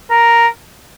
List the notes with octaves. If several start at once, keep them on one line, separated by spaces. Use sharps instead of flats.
A#4